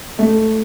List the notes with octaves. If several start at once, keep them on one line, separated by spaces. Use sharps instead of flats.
A3